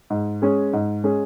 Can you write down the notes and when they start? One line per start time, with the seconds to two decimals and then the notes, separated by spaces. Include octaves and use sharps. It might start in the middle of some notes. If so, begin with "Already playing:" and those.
0.10 G#2
0.42 G#3 C#4 G#4
0.73 G#2
1.04 G#3 C#4 G#4